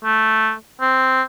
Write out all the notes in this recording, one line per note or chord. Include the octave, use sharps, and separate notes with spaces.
A3
C4